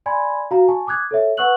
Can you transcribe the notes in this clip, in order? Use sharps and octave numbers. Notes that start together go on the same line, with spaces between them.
D5 G#5 B5 C6 G#6
F#4 F5 A#5
G#5 A5 C#6
D6 D#6 F#6 G#6
A4 C#5 E5
B4 F#5 C#6 E6 F#6 F#7